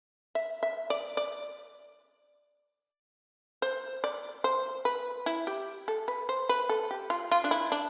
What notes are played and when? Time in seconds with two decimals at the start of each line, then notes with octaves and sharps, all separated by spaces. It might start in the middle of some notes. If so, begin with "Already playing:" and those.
0.35 E5
0.63 E5
0.90 D5
1.17 D5
3.62 C5
4.04 D5
4.44 C5
4.85 B4
5.26 E4
5.47 G4
5.88 A4
6.08 B4
6.29 C5
6.49 B4
6.69 A4
6.91 G4
7.10 F4
7.32 F4
7.44 D4
7.51 E4
7.72 D4